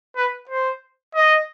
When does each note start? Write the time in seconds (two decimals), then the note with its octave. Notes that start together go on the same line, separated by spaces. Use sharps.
0.16 B4
0.50 C5
1.15 D#5